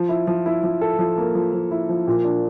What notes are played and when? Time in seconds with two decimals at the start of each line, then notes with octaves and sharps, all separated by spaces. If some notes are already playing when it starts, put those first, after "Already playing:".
Already playing: F3
0.09 E4
0.27 F3
0.46 E4
0.63 F3
0.81 A4
0.99 F3
1.18 A#3
1.35 F3
1.53 F3
1.71 E4
1.89 F3
2.07 A#2
2.24 D4